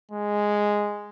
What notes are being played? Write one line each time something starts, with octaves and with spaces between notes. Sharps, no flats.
G#3